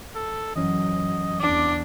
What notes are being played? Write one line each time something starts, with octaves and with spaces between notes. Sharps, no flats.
A4
F#2 E3 F#3 C#4 D#5
E2 D4 D6